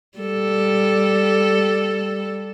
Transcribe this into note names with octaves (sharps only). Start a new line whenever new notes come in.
G3 A4